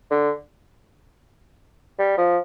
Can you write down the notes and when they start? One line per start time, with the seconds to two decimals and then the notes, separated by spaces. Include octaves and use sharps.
0.11 D3
1.99 G3
2.18 F3